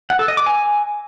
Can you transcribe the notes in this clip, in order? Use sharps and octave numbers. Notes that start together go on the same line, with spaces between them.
F#5
A4
D#5
D6
G#5